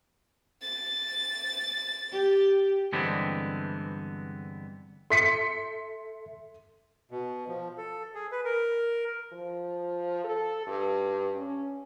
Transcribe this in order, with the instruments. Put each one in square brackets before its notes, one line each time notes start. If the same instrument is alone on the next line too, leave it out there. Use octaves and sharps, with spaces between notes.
[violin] A6
[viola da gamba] G4
[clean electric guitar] G2 D3 E3 G#3 B3 C4
[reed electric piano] A4 E5 [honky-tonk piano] C6 B6 C#7
[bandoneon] B2
F3
A4
G#4
B4
A#4
[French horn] F3
A4
G2
C#4